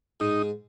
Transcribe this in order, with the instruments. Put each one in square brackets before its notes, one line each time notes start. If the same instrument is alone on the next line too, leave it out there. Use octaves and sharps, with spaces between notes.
[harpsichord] G#2 [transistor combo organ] D#4